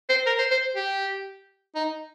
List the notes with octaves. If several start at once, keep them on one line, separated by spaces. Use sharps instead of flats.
C5
A#4
C5
C5
G4
D#4